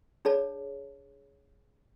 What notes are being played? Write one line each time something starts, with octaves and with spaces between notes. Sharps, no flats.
D4 G#4 C#5 D5 A5